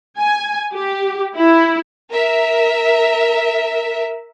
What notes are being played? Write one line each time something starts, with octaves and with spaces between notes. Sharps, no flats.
G#5
G4
E4
A#4 E5